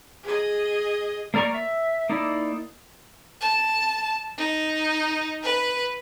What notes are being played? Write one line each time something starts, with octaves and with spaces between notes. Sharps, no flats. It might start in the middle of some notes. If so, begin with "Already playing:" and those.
G#4 D#5
A#3 A#4 D5 A#5 C#6
E5
A#3 D#4 E4 D5
A5
D#4
B4